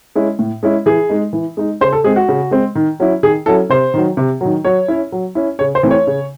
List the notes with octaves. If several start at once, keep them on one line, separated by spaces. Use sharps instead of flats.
G#3 C#4 E4
A2
G#3 C#4 E4
E3 G#4
G#3 D#4
E3
G#3 D#4
C#3 C5
A4
G#3 C4 G#4
F#4
C#3
G#3 C4
D#3
F#3 C#4 E4
D#3 G#4
F#3 C#4 E4 A4
C3 C5
D#3 F#3
C3
D#3 F#3
F#3 C#5
C#4 E4
F#3
C#4 E4
C#3 C#5
C5
E3 A3 C4 E4
C#5
C#3